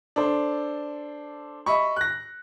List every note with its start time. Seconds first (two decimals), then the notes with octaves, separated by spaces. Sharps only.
0.16 D4 A4 C5
1.66 D#5 E5 B5 C#6
1.96 F#6 A#6